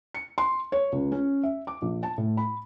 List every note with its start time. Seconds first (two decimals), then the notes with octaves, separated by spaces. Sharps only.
0.15 C#7
0.38 C6
0.72 C#5
0.92 C#2
1.12 C#4
1.43 E5
1.67 D6
1.82 A#1
2.03 A5
2.18 A2
2.37 B5